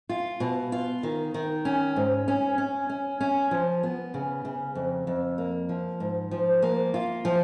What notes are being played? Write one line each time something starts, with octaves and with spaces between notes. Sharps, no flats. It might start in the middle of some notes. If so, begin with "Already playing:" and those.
F4
B2
F4
D#3
D#3
C#4
G#2
C#4
C#4
C#4
C#4
F3
B3
C#3
C#3
F2
F2
A#3
F3
G#2
F3
A#3
F4
F3